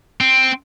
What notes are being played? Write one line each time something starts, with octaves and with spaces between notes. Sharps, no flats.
C4